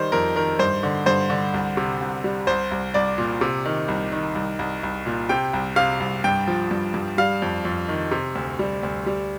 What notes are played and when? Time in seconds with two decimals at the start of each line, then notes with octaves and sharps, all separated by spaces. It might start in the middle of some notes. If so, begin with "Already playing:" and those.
Already playing: D#3 G3 C5
0.12 F2 A#4
0.36 D#3 A#4
0.59 G2 C5
0.83 D3
1.06 G2 C5
1.30 D3
1.54 C2
1.77 C3
2.01 C2
2.24 G3
2.47 C2 C5
2.71 C2
2.94 C2 D5
3.18 A#2
3.41 C3
3.66 D#3
3.88 C2
4.12 D#3
4.35 C2
4.59 C2
4.83 C2
5.06 A#2
5.29 C3 G5
5.53 C2
5.76 C3 F5
6.00 C2
6.24 G2 G5
6.48 F3
6.71 G2
6.94 G2
7.18 G3 F5
7.42 F2
7.65 F2
7.89 D#3
8.11 C3
8.35 D2
8.59 G3
8.83 D2
9.06 G3